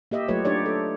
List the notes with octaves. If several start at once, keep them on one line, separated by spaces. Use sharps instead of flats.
A#3 G4 D#5 E5
F#3 A3 F4 G4 B4 C#5
D4 D#4 G4 C#5 D5
A4